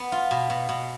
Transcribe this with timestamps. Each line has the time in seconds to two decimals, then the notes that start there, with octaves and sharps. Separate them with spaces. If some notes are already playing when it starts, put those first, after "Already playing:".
Already playing: B3
0.12 F4
0.31 B2
0.50 B2
0.69 B2